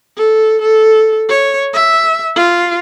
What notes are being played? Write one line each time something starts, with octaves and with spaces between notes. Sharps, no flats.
A4
A4
C#5
E5
F4